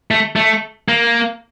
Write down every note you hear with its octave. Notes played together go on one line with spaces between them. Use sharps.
A3
A3
A#3